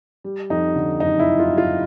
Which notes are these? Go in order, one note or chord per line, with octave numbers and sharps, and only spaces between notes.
G3
F2 D#4
D3
F#1 D#4
E4
D3
F4
G3
F4